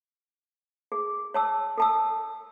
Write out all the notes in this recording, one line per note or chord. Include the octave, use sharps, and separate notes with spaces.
G#4
C#5 A5 E6
A4 A5 E6